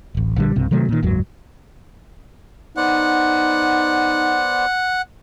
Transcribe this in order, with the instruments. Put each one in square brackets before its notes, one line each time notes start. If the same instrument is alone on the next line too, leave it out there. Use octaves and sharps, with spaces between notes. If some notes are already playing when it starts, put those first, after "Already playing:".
[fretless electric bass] D1 A1
A#1 D3 G3
B1 G2 C3
C3 D#3 F#3 A3
A#2 D#3
F#1 D#2 G#2 F#3
[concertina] B3 C5 D5 [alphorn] D#4 [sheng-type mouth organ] F#5